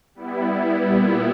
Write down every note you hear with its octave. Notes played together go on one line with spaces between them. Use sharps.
G3 B3 E4
A#2 G3 B3 E4